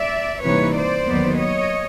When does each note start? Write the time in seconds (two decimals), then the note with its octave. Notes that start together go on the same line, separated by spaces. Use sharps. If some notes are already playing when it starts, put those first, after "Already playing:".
Already playing: D5 E5
0.44 C3 E3 G3 A#3 D#4 B4 C#5
0.76 C5 D5
1.07 D#2 D#3 F#3 B3
1.39 C#5 D#5